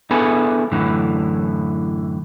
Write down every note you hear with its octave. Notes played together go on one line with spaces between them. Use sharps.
B3 D4 E4 G#4 A4 B4
F#2 A2 D3 E3